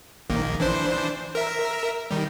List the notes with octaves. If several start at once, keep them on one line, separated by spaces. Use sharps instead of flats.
A#1 D#3 A#3
E3 D4 C5
A#4 E5
D#3 G3